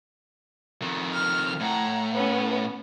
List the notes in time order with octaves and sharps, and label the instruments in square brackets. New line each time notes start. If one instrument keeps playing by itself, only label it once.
[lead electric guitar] F2 D#3
[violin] F6
[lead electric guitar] A2 [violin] F#5 A#5
[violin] B3 C#4